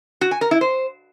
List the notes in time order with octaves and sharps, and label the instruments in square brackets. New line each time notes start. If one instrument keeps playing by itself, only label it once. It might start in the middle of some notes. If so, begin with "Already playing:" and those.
[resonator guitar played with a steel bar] F#4
G#5
A#4
E4
C5